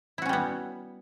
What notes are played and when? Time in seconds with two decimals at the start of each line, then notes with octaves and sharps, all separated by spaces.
0.18 E4
0.22 F#4
0.26 C#4
0.29 G3
0.33 B3